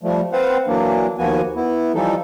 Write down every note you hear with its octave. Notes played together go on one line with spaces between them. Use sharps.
F3 G3 A3
C4 B4 C5 F5 F#5
E3 F#3 A#3 D4
D#2 F3 A#3 B3 F#4 G#5
B3 E4
E3 F3 G3 D#4 A4